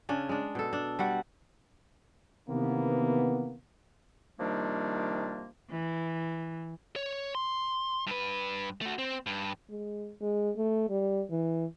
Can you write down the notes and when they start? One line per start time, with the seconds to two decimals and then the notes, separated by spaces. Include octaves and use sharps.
0.09 C#3 C#4 D4
0.29 G#3 D4
0.55 B2 A4
0.73 D4
0.99 G3 F#4 F#5
2.49 C3 D#3 E3 A#3 B3
4.40 C3 D#3 F3 G3 A#3 D4
5.71 E3
6.96 C#5
7.35 C6
8.07 G2 B4
8.81 A3 F#4
8.98 C4
9.27 G2
9.70 G#3
10.21 G#3
10.57 A3
10.89 G3
11.30 E3